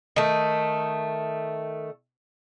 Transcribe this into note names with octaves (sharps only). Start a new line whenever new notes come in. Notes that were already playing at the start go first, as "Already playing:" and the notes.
D#3 A3